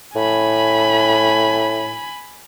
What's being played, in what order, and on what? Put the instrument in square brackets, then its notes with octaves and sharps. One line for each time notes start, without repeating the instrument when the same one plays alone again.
[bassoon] A2 [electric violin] G#5 B5